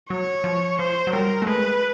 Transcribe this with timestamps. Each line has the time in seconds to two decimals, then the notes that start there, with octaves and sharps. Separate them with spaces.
0.10 F#3 C#5
0.44 F3
0.79 F3 C5
1.07 F#3
1.13 G3 A#4
1.42 A3
1.47 G#3 B4